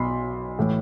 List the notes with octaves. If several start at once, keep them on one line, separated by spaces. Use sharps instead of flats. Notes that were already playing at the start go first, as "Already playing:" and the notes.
Already playing: B1 B2 B5 C6
A2 E3